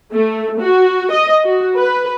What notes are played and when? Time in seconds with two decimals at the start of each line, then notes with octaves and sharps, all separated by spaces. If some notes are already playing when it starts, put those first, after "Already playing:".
0.12 A3
0.60 F#4
1.12 D#5
1.44 F#4
1.76 B4